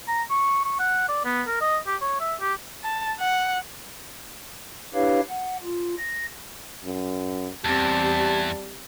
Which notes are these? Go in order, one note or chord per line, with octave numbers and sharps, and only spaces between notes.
A#5
C#6
C#6
F#5
D5
B3
A#4
D#5
G4
C#5
E5
G4
A5
F#5
D4 E4 G4 B4 C#5 F5
F#5
F4
A#6
F#2
E2 G3 C4 G4 A5